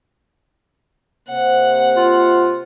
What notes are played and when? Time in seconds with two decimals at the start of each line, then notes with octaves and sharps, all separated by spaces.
1.29 C3 A#3 C5 F#5
1.97 F4